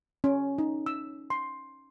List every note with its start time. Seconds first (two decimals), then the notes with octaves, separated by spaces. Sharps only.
0.24 C#4
0.58 D#4
0.86 E6
1.30 C6